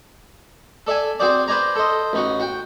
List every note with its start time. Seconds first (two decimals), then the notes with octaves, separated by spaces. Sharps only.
0.87 A4 D5 E5 G#5
1.20 C4 F#4 G#4 C5 D5
1.48 B4 C5 D5 G#5 A#5
1.75 A4 C5 D#5
2.13 A1 D#4 F#4
2.40 F#4 G5